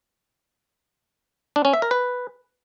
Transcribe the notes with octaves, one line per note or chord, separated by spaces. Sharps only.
D4
C#4
E5
A#4
B4